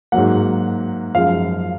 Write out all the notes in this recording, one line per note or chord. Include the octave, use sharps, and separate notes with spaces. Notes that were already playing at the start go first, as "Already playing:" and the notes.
G#2 F#3 A#3 F#5
F#2 F3 G#3 F5